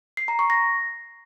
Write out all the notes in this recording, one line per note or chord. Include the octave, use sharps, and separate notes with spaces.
C7
A#5
C#6
A#6